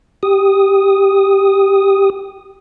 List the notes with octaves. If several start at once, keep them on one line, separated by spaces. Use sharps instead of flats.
G4 D#6